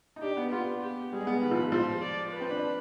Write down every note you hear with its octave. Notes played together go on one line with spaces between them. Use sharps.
D#4
D4 G4
B3
B3 F4
G4
G3 G#4
G#3
B3
D#3 B4
F3
G#3
F3 C5
D5
B4
C4
D4